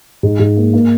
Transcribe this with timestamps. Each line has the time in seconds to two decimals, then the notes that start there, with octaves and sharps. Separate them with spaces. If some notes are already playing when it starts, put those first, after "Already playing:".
0.23 G#2
0.39 G#2
0.57 A#3
0.73 A#3